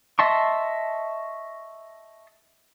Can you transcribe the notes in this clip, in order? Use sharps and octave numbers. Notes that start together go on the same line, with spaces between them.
D#5 E5 A5 C6 C#6